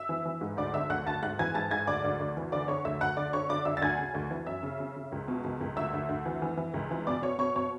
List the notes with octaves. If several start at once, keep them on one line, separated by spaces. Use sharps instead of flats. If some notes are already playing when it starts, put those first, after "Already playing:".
Already playing: E5 E6
E3
E3
G#2
D2 D5 D6
D3 E5 E6
D2 F#5 F#6
D2 A5 A6
G#2 F#5 F#6
E3 G#5 G#6
G#2 A5 A6
G#2 G#5 G#6
D2 D5 D6
D2
D2
E3
D3 D5 D6
D3 C#5 C#6
D2 E5 E6
D2 F#5 F#6
D3 D5 D6
D3 C#5 C#6
D3 D5 D6
D3 E5 E6
A6
D2 G#5 G#6
C#3
D2
E3
F#2 E5 E6
C#3
C#3
C#3
C#2
B2
C#2
C#2
D2 E5 E6
D2
D2
E3
E3
E3
C#2
E3
B2 D5 D6
B2 C#5 C#6
B2 C#5 C#6
B2 C#5 C#6